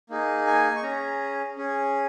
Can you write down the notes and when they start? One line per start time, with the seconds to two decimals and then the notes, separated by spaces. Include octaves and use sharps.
0.10 A#3 D#4 G#4
0.47 G#5
0.76 C#6
0.83 C#4 G#4 A#5
1.57 C#4 G#4